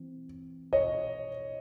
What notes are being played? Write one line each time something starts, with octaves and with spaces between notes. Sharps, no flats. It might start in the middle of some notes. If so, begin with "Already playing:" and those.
Already playing: E3 C4
C#5 D#5